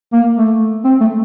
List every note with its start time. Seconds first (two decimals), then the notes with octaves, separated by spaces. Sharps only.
0.13 A#3
0.37 A3
0.85 C4
1.01 A3